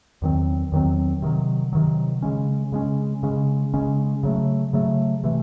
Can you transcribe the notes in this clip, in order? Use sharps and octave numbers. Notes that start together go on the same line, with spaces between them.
E2 D#3 F#3 C4
E2 D#3 F#3 C4
C3 D#3 F#3
C3 D#3 F#3
C#3 G#3 C#4
C#3 G#3 C#4
C#3 G#3 C#4
C#3 G#3 C#4
C#3 F#3 A3
C#3 F#3 A3
C3 E3 A3